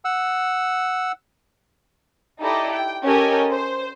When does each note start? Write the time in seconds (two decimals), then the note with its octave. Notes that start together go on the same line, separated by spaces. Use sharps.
0.05 F#5 E6
2.40 D#4 E4 G4 A4 D5 D#5
2.70 G5
3.04 C#4 G4 A4 A#4 D#5 G#5
3.51 C5